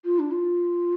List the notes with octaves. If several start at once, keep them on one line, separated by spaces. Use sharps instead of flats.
F4
D4
F4